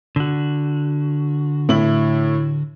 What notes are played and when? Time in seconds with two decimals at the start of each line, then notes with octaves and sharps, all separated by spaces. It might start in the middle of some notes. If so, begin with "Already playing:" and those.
0.16 D3 F#4
1.69 A2 E4 F#7